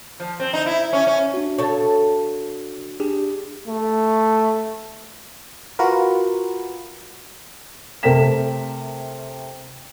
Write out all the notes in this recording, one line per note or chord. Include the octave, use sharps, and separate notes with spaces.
F3
C4
D#4
E4
C#4
C#4
D4 F#4
C#3 A4 C#5
D4 G4 G#4
A3
F4 F#4 A#4 B4
C3 A3 A#4 G5 B6 E7